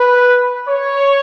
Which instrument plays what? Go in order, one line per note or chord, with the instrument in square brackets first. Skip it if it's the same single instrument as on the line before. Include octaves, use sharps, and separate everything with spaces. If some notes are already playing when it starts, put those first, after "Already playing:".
Already playing: [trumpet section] B4
C#5